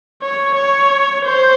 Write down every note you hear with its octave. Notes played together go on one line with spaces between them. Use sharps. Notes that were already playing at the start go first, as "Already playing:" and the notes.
C#5
C#5
C5